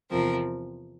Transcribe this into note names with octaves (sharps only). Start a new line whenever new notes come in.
E2 C3 F3 C4 A#4